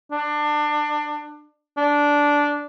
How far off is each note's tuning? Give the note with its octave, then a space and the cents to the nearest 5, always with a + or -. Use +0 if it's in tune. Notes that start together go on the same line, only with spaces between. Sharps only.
D4 +25
D4 -10